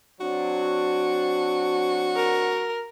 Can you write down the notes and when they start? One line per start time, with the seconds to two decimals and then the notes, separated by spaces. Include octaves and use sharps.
0.21 F#3 C4 D4 F#4
2.16 A#4